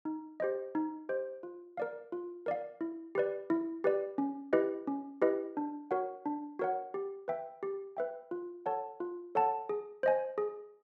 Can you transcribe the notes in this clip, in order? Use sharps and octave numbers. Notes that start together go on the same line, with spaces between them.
D#4
G4 C5 D#5
D#4
G4 C5 D#5
F4
A#4 D5 F5
F4
A#4 D5 F5
E4
G4 B4 D5
E4
G4 B4 D5
C#4
E4 G4 B4 D#5
C#4
E4 G4 B4 D#5
D4
F#4 A#4 C#5 F#5
D4
F#4 A#4 C#5 F#5
G4
B4 E5 G5
G4
B4 E5 G5
F4
A4 C#5 F#5 A5
F4
A4 C#5 F#5 A5
G#4
C5 D#5 G#5
G#4